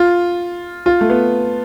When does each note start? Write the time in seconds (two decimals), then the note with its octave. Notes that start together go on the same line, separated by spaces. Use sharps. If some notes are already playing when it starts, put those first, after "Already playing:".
Already playing: F4
0.86 F4
1.01 A3
1.10 B3